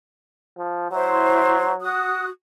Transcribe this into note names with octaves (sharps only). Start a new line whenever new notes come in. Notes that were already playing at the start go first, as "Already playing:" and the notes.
F3
F#3 E4 C5
F#4 D#6 F#6